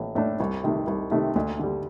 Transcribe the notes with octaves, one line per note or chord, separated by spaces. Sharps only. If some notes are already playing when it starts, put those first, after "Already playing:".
Already playing: A1 A2
A2 A3 D4
C2
C3 D#3 A3
C2
C3 D#3 A3
D2
D3 G3